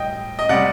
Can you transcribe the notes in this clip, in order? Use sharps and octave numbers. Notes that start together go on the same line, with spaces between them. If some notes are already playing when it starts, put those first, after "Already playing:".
Already playing: A2 G3 D#5 G5
D#5
C3 G3 D5 F#5